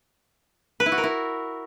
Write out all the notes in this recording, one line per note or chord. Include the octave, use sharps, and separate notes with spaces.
B4
E4
F#4
A#4
E4